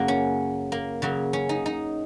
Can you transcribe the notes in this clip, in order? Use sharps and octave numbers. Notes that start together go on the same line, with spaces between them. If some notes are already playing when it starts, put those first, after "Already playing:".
Already playing: F#2 C#3 A#3 F#4
C#4
A#3
C#3 F#3 A#3
C#4
D#4
D#4